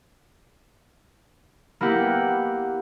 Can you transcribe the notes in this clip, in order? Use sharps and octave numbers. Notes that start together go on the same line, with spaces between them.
A#3 B3 E4 G4 F#5